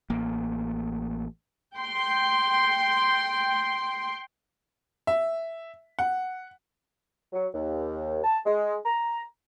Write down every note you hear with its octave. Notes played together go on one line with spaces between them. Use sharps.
A1 A#3
G5 C6
E5
F#5
F#3
D#2
A5
G#3
A#5